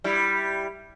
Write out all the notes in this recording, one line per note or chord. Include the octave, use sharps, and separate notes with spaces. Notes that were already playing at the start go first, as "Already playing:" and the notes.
G3 E4